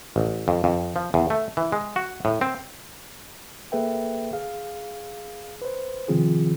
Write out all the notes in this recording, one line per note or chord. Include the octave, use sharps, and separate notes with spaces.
A1
F2
F2
F3
E2
A3
E3
G#3
F#4
A2
C4
A#3 G#4 A4 B4 E5 G5
G#4 F5
B4 C5
C3 D#3 F3 C4 F4 G#4